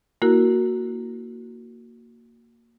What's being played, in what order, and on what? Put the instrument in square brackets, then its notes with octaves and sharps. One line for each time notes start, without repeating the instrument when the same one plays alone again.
[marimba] A#3 E4 F#4 A#4